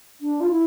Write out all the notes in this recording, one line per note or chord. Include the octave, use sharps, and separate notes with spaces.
D4
F4
E4